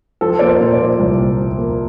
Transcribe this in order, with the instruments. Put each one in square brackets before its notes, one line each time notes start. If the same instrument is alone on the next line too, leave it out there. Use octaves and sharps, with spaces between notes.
[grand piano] F3 [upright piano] A4
[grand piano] A#3 [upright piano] D5
[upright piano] C5
[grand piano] A#2
[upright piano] D5
[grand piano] F3
C2
A#2
F3
A#3